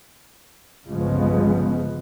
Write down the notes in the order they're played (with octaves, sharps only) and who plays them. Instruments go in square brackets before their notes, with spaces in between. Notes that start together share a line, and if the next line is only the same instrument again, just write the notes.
[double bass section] G1 C2 C#3 F3 G#3 B3